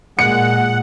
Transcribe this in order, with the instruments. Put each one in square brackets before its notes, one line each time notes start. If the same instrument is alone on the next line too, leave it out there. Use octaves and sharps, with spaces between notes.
[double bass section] A#2 [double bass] G#3 [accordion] F#5 [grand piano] C#7